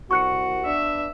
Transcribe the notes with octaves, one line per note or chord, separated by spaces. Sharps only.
C2 F#4 C#6 F#6 C#7
B3 D4 E5